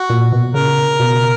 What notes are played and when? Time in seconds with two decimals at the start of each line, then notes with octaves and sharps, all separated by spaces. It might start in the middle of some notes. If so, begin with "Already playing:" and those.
Already playing: F#4
0.10 A#2
0.33 B2
0.54 C#3 A#4
1.00 B2